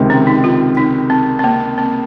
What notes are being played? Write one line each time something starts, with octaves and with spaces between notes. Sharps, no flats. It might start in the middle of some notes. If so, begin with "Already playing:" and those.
Already playing: C#2 C3 D#3 G#3 C4
C#4
D#4
F4
D#4
C4
C4
A#3
C4